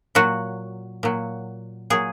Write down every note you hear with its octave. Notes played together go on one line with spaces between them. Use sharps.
A#2 F#3 F#4
A#2 F#3
A#2 F#3 G#4